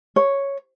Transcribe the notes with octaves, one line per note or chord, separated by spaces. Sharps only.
C#5